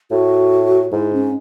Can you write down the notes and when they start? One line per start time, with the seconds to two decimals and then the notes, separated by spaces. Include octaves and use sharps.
0.11 A2 F#4
0.92 G#2 E4
1.13 C#4